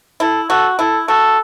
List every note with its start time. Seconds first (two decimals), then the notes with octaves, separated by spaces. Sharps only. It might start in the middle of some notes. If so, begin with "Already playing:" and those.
0.20 E4 A4
0.49 F#4 A4
0.79 E4 A4
1.08 F#4 A4